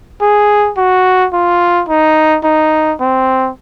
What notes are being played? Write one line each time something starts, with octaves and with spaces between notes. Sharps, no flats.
G#4
F#4
F4
D#4
D#4
C4